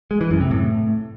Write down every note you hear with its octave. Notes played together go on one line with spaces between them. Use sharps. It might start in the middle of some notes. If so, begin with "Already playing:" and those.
G#3
E3
F#2
C3
A2